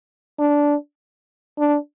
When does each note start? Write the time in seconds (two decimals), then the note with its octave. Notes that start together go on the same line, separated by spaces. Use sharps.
0.39 D4
1.59 D4